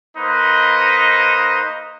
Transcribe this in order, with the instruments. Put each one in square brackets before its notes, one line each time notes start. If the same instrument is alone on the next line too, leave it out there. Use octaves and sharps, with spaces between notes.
[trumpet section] A#3 D#4 B4 C5 D#5